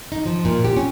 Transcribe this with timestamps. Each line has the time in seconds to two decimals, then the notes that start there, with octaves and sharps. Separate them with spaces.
0.12 D#4
0.26 F3
0.45 A#2
0.64 G4
0.77 C#4